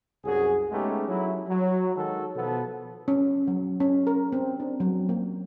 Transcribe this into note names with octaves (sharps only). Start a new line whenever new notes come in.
C2 F#2 F#4 G#4
G#3 A3 B3 C#4 D#4 G4
F#3 E4
F#3
D#3 G#3 F#4 A4
B2 F3 B3 A4
C#4
F#3
C#4
A#4
C4
D4
F#3
A#3